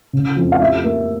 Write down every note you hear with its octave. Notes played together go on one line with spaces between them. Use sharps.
C#3
F2
F5
G3 E5
A#3